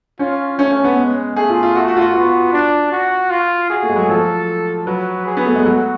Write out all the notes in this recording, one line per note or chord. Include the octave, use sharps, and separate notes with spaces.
C#4 F4
A3 C#4
C#4
B3
G#3
A3 G#4
F4
F4
A3 F#4
F#4
F4
F#4
B3 F4
D4
F#4
F4
F#4 G#4
A3
G#3
F#3
F3 A4
F#3 B4
G#4
B3
A3
G#3
F#3 F#4